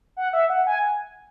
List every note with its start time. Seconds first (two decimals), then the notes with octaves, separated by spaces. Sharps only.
0.17 F#5
0.33 E5
0.50 F#5
0.67 G#5